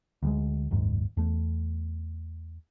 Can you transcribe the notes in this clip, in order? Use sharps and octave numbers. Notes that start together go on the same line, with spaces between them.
D2 G3 G#3
F#1 D#2 G#2
E2 A3